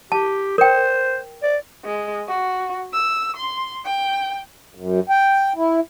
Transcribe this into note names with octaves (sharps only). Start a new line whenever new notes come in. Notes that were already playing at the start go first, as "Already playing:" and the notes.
G4 A5
A#4 C5 G5
D5
G#3
F#4
E6
C6
G5
F#2
G5
E4